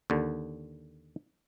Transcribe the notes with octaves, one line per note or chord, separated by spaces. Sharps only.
D#2 D3